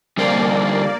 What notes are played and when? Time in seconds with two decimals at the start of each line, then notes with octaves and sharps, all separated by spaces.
0.18 D3 G3 A#3 C5 D5